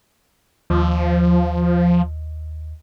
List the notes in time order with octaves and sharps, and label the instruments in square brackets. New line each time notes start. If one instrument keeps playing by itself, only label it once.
[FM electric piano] D#2 [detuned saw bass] F3